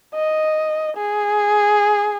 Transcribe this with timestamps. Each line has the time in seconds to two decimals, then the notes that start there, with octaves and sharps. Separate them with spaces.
0.15 D#5
0.97 G#4